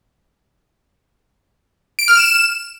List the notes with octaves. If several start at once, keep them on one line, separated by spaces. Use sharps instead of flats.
D7
F6
E7